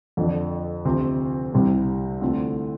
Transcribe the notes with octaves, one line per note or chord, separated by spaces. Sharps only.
F2 D3 F3 D4
D2 C3 F3 C4
C2 C3 G3 C4
D2 D3 A3 C4 F4